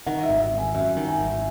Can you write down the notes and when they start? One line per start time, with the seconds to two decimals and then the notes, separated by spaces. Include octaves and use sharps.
0.06 D#3 F#5
0.23 E5
0.29 G#1
0.40 E5
0.52 G#1
0.58 G#5
0.74 F#2 E5
0.97 D#3
1.08 G#5
1.19 G#1